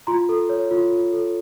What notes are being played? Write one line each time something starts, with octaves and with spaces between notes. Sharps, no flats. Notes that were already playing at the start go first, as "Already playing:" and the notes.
F4 A#5 C6
A4
C#5
F4
F4
A4